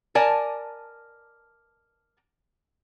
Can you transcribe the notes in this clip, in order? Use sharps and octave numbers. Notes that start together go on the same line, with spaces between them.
A#4 D5 G#5 A5